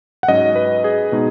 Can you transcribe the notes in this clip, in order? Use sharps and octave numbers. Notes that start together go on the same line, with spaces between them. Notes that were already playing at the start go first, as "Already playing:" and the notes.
F#5
G#2 F#3 C#4 D#5
B4
G#4
B2 G#3 D#4